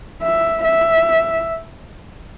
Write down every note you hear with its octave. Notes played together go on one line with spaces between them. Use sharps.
E5
E5